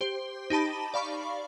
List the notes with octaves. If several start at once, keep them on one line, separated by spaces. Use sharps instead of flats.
G4 C5
D#4 G4 A5 B5
D5 F5 B5 C#6